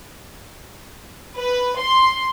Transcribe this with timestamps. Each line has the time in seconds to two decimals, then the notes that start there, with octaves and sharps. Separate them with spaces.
1.36 B4
1.78 C6